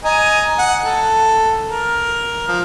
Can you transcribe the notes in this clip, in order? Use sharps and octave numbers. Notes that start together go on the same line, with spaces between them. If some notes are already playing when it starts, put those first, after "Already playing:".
D#5 G#5 A#5
F#5
A4
A#4
F3